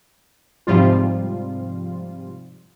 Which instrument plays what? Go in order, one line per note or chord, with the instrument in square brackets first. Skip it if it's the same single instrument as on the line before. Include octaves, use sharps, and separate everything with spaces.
[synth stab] G#2 C3 F3 G3 F4